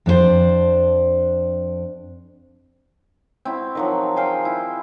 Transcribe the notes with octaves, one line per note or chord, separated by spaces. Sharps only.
F2 D4 G4 C5
C4 E4 F#4
D#3 F3 F#3
G#4 C5 F5 G5
E4